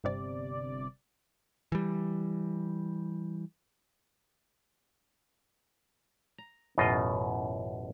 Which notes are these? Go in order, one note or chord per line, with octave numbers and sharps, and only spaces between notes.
G1 C3 D5
E3 G3
A#5
A1 F#2 B2 F4 D#5